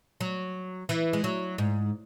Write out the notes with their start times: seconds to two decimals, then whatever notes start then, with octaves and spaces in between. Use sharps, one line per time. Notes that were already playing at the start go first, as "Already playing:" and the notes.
0.21 F#3
0.89 E3
1.13 G#3
1.24 F#3
1.58 G#2